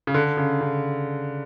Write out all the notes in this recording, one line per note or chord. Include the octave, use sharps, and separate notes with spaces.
C#3
D3
C#3
C#3